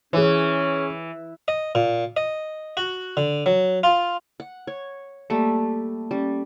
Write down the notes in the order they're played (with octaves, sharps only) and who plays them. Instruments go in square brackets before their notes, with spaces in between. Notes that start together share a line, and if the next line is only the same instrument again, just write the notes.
[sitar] E3 [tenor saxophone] C#4 [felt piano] G#4 C#5
[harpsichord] D#5
A#2
D#5
F#4
D3
F#3
F4
[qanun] F#5
C#5
[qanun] G3 A3 [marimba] A#3
[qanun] G3 [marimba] C#4